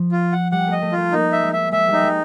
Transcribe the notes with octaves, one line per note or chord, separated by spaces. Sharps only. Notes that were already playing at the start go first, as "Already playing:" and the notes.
Already playing: F3
F4
F#5
G3 F#5
A3 D#5
A3
A3 F4
A#3 D#4
E5
G#3
E5
G#3 E5
G3 D#4
G#3